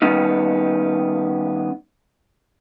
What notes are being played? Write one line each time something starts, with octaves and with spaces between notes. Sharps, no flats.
D#3 G3 B3 C#4 D#4